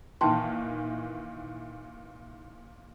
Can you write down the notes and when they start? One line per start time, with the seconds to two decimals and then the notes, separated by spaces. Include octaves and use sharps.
0.21 A#2 D#3 E3 G5 A5 C6